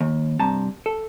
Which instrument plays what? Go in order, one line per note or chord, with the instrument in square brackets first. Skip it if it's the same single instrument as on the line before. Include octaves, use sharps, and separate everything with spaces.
[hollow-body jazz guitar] D#2
G2 C3 A5 A#5
A4